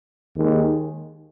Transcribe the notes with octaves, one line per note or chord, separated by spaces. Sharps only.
D#2 D#3 G#3